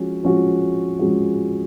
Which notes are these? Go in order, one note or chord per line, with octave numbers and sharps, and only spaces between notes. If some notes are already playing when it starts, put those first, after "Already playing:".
Already playing: F3 G#3 C#4 F#4
F3 G#3 C#4 F#4
F3 G#3 C#4 F#4